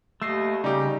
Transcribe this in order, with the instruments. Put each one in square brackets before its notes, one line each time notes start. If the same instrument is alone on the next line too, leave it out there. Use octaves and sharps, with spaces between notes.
[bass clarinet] D#2 [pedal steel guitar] A3 D#5 [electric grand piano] E6 C7
[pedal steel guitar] C#3 [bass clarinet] G3 [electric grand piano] D#4 G4